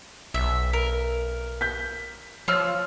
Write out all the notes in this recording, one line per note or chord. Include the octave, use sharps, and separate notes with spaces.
B1 E5
A#4
G6 B6
F3 F4 C#5 E6 F6